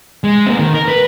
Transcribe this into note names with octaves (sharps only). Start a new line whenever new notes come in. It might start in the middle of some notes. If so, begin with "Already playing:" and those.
G#3
A#3 C4
D#3
A#4
B4